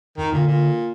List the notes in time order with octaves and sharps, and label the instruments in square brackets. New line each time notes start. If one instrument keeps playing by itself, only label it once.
[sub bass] F2 [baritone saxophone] D#3
[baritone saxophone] A#2 [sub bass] D3
[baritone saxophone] A#2